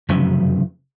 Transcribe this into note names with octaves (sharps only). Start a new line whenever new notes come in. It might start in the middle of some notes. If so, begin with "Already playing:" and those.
F1 F#2 C#3 E3